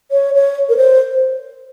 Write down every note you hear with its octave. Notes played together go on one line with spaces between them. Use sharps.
C#5
C#5
A#4
C5